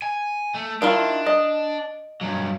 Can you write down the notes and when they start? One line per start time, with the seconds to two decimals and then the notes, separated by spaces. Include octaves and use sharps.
0.02 G#5
0.54 A3
0.82 D#3 D4 E4 F4
1.26 D#5
2.21 G2 F#3